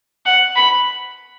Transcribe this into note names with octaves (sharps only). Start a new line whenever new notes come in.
F#5
B5